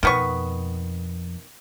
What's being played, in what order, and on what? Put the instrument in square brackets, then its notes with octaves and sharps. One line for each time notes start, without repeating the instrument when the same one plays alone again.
[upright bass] F2 B2 [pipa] D#3 B3 C#6